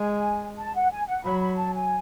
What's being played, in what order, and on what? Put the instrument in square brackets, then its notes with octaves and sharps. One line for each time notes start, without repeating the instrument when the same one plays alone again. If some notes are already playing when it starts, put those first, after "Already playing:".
Already playing: [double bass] G#3 [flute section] G#5
[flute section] A5
F#5
G#5
F#5
[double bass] F#3 [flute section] B5
[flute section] B5
A5
G#5